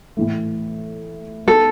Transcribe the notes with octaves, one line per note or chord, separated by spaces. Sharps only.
A2 E3 A3
B3 D#4 G#4 A4